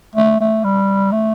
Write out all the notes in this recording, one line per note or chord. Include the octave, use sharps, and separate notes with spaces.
A3
A3
G3
A3